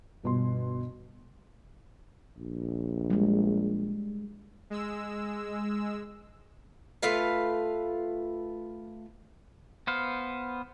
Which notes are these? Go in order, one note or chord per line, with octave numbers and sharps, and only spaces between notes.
G1 B2 C6
A#1
G3 G#3
G#3 E6
A3 F4 B4 F5
B3 C5 F5